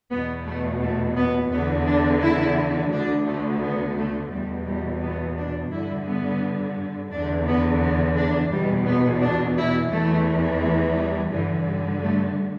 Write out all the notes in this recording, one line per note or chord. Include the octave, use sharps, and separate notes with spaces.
E2 B2 B3
A3
A3
B3
E2 D3 B3
D4
E4
D2 D3 D4
A3
B3
A3
E2 B2 G3
G3
B3
D4
G2 D3 E4
B3
E2 D3 D4
B3
B3
D4
E2 B2 G3
B3
D4
E4
E2 E3 A3
A3
G3
G2 D3 E3
G3
A3